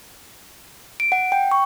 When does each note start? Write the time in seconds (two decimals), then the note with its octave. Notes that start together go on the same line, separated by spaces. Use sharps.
1.00 D7
1.12 F#5
1.32 G5
1.51 C#6